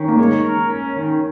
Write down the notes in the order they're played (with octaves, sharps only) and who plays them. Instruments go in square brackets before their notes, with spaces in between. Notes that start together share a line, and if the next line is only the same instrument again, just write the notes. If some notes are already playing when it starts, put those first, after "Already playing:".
Already playing: [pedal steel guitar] D#3 C#4
[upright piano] A#3
[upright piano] G#3 [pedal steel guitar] C#5
[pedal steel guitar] A#4
C#4
D#3